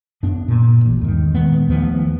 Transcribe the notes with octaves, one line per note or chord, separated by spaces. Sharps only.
F#2 B3 D4
A#2
A1
E2 G#2 D#3
D#1 D#3 G#3 B3
D#2 F3 A3 B3